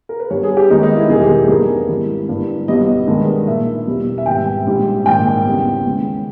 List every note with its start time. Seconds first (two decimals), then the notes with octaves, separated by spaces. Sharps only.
0.09 A#4
0.20 B4
0.30 G2 G3 B3 C#5
0.43 G#4
0.57 G4
0.70 D#2 D#3 G#3 B3 D#4
0.83 D#4
0.96 E4
1.10 E1 E2 D#3 G3 G#4
1.22 G4
1.34 G#4
1.49 G2 G3 B3 A#4
1.89 G#1 G#2 E3 G3
2.29 G1 G2 E3
2.67 B1 B2 G3 B3 D#5
3.07 G2 D#3 G#3 B3
3.47 A#1 A#2 A#3 E5
3.87 E2 B2 G3 A#3
4.18 E5
4.26 G#1 G#2 G3 B3 G5
4.66 A#1 G#2 G3
5.05 A#1 G#2 D#3 A#3 G5
5.45 E2 C#3 G3 B3
5.84 D#2 C#3 G#3 B3